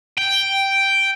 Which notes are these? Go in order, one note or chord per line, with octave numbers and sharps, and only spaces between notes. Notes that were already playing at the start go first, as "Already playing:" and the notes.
G5